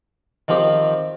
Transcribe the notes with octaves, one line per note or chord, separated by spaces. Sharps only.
D#3 F3 C4 G4